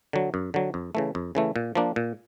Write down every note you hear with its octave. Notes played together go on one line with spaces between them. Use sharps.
D3 F#3
F#2
D3 F#3
F2
C#3 E3 A3
F2
C#3 E3 A3
A#2
F3 A#3 D4
A#2